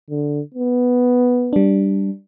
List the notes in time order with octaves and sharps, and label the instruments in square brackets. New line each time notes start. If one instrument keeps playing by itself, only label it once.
[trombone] D3
B3
[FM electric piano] G3 D4